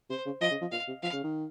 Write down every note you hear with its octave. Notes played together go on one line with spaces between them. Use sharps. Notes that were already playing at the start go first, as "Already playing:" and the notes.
C3 C5
C#3
F3 D#5
C#3
F3
A#2 F5
C3
F3 F5
C#3
D#3